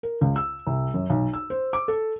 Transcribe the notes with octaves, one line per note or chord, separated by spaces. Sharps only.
A#4
C#2
E6
C2
F#2
B1
E6
C5
D6
A4